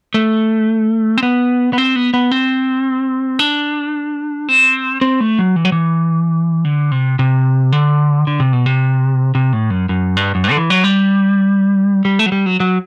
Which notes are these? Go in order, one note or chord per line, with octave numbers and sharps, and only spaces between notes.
A3
C4
B3
B3
C4
B3
B3
C4
D4
C4
C4
A3
F#3
E3
F#3
E3
D3
C3
C3
D3
D3
C3
B2
C3
C3
A2
F#2
F#2
G2
F#2
G2
D3
E3
F#3
G3
G3
A3
F#3
G3
F#3
F#3